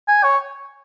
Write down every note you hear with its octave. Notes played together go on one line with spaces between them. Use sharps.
G#5
C#5